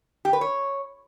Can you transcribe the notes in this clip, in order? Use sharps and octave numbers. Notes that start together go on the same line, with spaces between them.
G4
B4
C#5